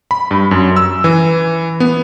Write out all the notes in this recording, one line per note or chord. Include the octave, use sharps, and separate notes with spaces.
B5
G2
F#2
E6
E3
B3